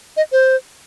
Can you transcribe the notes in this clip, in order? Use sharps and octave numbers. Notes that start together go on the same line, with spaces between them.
D#5
C5